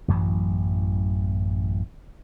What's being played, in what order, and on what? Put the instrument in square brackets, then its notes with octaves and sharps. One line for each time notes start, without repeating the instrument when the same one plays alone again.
[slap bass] A1 F#2 E3 F#3